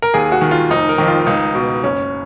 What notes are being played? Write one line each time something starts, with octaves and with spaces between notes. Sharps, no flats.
A#4
D#2 G#4
F#4
D#3
F4
F1 D#4
A#4
F2 D#3
F4
C#2 D#4
B2
F#1 C#4